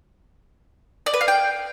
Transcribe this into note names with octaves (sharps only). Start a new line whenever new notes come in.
D5
B4
F5
G5